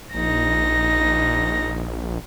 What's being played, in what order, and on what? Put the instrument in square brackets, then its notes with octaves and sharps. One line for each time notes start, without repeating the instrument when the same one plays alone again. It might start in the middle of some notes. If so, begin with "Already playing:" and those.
[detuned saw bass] A#1 [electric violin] D#4 A#6